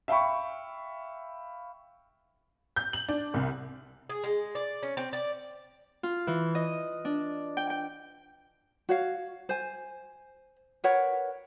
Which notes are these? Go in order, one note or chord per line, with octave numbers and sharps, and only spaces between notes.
E5 F5 G5 B5 C#6
G6
F#7
D4
C2
G#4
G#3
D5
C#4
C4
D5
F4
E3
D#5
D4
G5
G5
F#4 C#5 F5
C5 G#5
A#4 B4 C#5 F#5